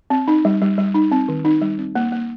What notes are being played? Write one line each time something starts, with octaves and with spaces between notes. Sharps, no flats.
C4
D#4
G3
G3
G3
D#4
C4
D#3
D#4
G3
C4
A#3
A#3